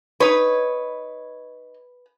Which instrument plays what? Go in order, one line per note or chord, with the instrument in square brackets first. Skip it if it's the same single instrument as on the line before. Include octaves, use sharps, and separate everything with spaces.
[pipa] D#4 C#5 [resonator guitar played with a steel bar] B4